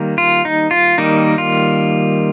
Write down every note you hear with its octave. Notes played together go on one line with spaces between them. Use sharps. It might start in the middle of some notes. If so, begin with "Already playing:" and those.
Already playing: D#3 G3 A#3
F4
D#4
F4
D#3 G3 A#3 D#4
F4